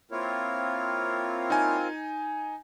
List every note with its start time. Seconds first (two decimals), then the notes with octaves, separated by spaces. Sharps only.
0.11 A#3 C4 E4 F4 A#4 C#5
1.50 D#4 G#5